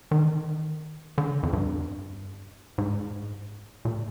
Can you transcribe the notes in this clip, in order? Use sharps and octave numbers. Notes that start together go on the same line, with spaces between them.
D#3
D3
F2
G2
G#2
A#2